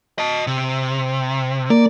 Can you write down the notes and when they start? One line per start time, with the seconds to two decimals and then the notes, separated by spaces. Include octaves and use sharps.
0.18 D#5 A5
0.47 C3
1.70 A#3 D5